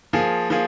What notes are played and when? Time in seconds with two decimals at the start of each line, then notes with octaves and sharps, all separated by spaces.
0.13 F3 A#3 F4 G#4
0.50 F3 A#3 F4 G#4